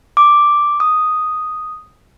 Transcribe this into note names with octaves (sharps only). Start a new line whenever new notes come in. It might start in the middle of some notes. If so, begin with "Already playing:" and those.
D6
D#6